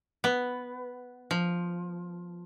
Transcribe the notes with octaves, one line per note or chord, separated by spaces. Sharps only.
B3
F3